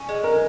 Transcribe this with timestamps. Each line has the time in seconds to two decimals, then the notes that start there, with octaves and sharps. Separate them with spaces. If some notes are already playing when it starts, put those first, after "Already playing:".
Already playing: C#4
0.09 G#3
0.24 A#4